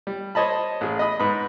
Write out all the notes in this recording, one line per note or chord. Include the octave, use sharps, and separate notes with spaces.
G3
C5 C#5 D#5 A5 B5
A1 G#4
D#5 B5 D#6
G#2 B4 B5